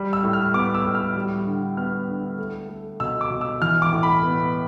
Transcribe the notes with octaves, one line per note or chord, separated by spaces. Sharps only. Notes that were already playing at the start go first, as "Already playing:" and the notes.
Already playing: G3
E6
A2
F6
B3 D6
E6
A2
F6
G3
D3
B3 F6
D3
A3
A3
B2 E6
D6
B2
E6
E3 F6
D6
A2
B5
B3